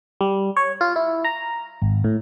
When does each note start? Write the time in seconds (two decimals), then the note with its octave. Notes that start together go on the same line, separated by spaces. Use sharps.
0.21 G3
0.57 C#5
0.81 F4
0.96 E4
1.24 A#5
1.82 G#1
2.04 A2